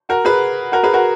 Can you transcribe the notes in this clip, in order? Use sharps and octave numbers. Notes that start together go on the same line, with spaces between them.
F#4 A#4
G#4 B4
F#4 A#4
G#4 B4
F#4 A#4